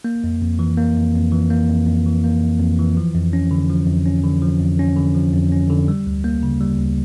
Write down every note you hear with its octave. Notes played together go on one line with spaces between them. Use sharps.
A#3
F2
F2
E3
A#3
F2
F2
E3
A#3
F2
F2
E3
A#3
F2
F2
E3
F3
F2
C#4
D3
F3
F2
C#4
D3
F3
F2
C#4
D3
F3
F2
C#4
D3
G3
D2
A#3
C#3
G3
D2